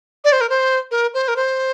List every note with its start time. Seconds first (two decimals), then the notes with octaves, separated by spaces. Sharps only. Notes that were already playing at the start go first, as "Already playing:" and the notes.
0.24 D5
0.32 C5
0.41 A#4
0.49 C5
0.91 A#4
1.14 C5
1.28 A#4
1.36 C5